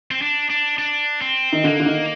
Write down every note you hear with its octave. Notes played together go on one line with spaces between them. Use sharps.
C4
D4
D4
D4
C4
D#3
D3 A#3
D3
D#3